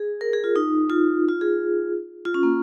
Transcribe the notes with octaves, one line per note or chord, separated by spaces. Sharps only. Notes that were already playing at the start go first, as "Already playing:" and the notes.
Already playing: G#4
A#4
G#4
F4
D#4
F4
F4
G#4
F4
C#4
A#3